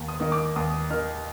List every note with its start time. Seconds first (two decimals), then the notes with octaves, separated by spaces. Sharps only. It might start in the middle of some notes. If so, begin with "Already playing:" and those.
Already playing: D#2
0.08 D#6
0.20 D#3 A#3 D#4
0.32 D6
0.56 D#2 D#6
0.90 D#3 A#3 D#4 F6